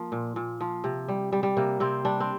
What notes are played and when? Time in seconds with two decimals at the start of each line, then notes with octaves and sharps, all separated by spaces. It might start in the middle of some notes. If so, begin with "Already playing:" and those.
Already playing: F3 A#3
0.12 A#2
0.36 A#2
0.61 F3
0.84 C3
1.08 G3
1.32 G3
1.43 G3
1.57 C3 A#3
1.80 C3 C4
2.05 G3 D4
2.20 C4